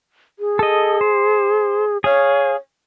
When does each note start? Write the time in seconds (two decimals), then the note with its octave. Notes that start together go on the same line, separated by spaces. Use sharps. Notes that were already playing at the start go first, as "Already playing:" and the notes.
0.39 G#4
0.59 A4 D#5
1.01 C5
2.04 G#4 C#5 F5